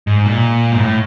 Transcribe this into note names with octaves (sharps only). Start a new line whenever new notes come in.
G#2
A#2
G#2
A2